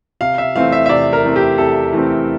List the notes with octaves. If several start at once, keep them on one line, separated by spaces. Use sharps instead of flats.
C3 F5
E5
E3 A3 C4 F5
E5
E5
C3 D5
A#4
E3 A3 C4
G4
C3 A4
E3 A3 C4